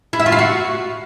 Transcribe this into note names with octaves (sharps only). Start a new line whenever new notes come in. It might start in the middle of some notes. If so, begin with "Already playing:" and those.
E4
E5
F4
F5
F#4